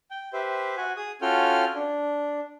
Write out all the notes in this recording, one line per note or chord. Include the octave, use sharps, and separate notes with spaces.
G5
G4 B4 C5 E5
F#4 F#5 G#5
G#4 D#6
C#4 F4 F#4 A4 G5 F6
D4